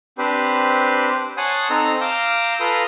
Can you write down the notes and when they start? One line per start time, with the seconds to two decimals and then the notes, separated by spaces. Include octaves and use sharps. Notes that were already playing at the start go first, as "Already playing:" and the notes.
0.18 C4 D4 G4 B4 C5
1.37 C#5 F#5 G#5 A5 C6 D#6
1.70 C4 D#4 A4 A#5
2.01 F5 A#5 D6 E6 G6
2.60 F4 A4 B4 A#5 C6 D#6